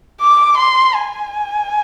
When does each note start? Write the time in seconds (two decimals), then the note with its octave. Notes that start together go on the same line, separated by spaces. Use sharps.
0.21 D6
0.58 C6
0.95 G#5